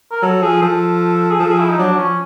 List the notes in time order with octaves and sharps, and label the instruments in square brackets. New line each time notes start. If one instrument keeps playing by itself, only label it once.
[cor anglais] A#4
[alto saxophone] F#3 [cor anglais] A4
[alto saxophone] F3 [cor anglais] G#4
[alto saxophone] F3 [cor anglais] A4
[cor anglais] G#4
[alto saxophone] F3 [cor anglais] A4
[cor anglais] G#4
E4
D#4
[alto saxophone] F#3 [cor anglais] D4
[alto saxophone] F#3
[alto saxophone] F3 [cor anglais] C#4